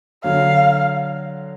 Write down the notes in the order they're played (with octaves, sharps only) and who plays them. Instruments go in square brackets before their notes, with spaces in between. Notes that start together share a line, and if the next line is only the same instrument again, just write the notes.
[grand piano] D3 F#3 [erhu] F5